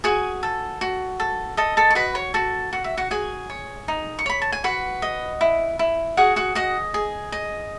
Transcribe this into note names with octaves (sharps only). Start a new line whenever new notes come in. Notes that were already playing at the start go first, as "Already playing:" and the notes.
F#4 G#4 G#5
A4
F#4
A4
A4 D#5 A5
A4 A5
C#6
F#4 B4 B5
C#5 C#6
F#4 A4 A5
F#4 F#5
E5
F#4 F#5
F#4 G#4 G#5
C#5
D#4
C#6
C#5 B5
A5
G#5
F#4 B4 F#5
D#5
E4
E4
F#4 G#4 F#5
F#4 F#5
F#4 D#5 F#5
G#4
D#5